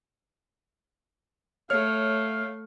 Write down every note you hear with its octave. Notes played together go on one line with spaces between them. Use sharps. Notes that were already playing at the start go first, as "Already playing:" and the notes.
A3 C#5 F5 F6